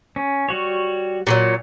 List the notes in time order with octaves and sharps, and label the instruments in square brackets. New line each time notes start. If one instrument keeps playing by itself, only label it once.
[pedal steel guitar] C#4
G3 F#4 C#5
[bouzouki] A#2 D3 F#3